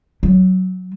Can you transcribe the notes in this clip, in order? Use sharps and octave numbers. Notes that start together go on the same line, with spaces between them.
F#3